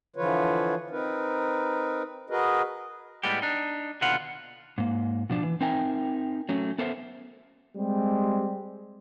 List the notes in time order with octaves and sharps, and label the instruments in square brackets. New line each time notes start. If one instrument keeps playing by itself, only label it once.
[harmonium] D3 E3 F3 F4 B4 C#5
C4 D#4 A#4 B4
F#4 G#4 A#4 B4 D#5
[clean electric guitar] A2 G3 G#3 B3 G4
D4 D#4
D#2 B2 D3 B3 F4 F#5
[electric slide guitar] G#2 A#3
B2 F3 D4
E3
C4 D#4 A#4 E5 G5 G#5
F#3 A3 C#4
B3 A4 A#4 C5 E5
[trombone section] G3 G#3 C4 G4